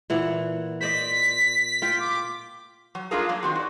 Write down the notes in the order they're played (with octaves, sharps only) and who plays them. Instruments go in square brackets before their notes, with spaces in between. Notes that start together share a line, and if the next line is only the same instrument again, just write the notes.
[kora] A#2 E3 F#5
[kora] C5 D5 D#5 [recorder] B6
[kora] F4 G5
[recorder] D6
[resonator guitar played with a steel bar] F#3
G3 A3 D4 F4 G#4 A#4
F#3 A#3
D#3 C4 F#4
F#4 D5